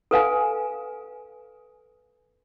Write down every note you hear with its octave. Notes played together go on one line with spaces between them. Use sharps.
A4 B4 F5 G#5